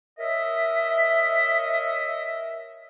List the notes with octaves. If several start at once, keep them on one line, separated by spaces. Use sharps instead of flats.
A#4 C#5 D#5 E5